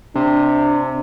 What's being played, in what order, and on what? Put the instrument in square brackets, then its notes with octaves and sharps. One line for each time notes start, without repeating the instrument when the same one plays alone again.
[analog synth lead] C3 [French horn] D4